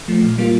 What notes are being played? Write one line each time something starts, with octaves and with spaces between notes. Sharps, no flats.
F3 A3
A#2
G3 A#3 F4